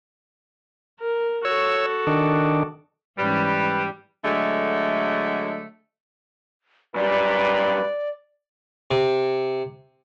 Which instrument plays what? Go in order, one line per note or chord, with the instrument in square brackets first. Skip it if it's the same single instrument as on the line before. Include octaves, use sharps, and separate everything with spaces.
[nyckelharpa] A#4
[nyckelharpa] F#4 A4 [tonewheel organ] C#5 E6
[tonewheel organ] D#3 D4
[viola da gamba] G#2 E3 C#4 [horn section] G3 [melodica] B4
[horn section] D3 F#3 G#3 A3
[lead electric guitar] F#2 G3 [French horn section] A#2 [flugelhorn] B4 [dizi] D5
[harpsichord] C3